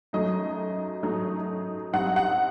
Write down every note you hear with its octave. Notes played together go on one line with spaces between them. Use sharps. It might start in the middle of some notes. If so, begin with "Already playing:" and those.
F#2 F#3 A3 D#4 D#5
F#2 F#3 A3 D#4
G2 F#3 C4 D#4 F#5
F#5